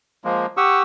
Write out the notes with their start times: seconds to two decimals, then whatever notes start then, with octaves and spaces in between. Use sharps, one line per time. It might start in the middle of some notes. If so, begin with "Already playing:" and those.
0.24 F3 G#3 A#3
0.57 G4 F#5 C#6 D#6 E6